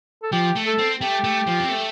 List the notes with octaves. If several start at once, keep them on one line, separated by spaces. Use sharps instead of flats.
A4
F3 G4
A3
A4
C4
A3 G4
A3
F3
C4
A3